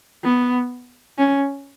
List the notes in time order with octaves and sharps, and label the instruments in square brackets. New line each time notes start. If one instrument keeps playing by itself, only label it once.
[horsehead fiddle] B3
C#4